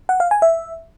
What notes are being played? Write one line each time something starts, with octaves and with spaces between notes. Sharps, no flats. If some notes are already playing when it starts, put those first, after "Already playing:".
F#5
F5
G#5
E5